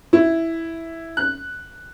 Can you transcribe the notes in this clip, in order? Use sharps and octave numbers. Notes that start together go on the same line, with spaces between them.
E4
F#6